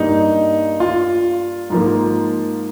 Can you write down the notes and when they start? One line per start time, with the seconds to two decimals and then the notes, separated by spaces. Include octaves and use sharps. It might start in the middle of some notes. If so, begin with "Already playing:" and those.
Already playing: G2 G3 A#3 D#4
0.80 F4
1.70 G#2 F3 A#3